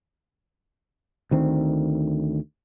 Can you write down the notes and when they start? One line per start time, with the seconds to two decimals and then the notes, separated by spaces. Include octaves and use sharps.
1.31 D2 D#3 C4